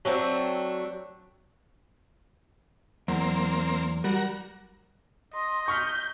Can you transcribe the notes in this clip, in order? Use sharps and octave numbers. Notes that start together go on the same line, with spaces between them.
F#3 A3 C4 D4
E2 F#3 A#3 C4
G3 F#4 A#4
D#5 C6
C#6 F6 G6 B6